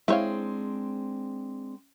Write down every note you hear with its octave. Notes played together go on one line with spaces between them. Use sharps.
G#3 C4 D4 E4 C#5 F5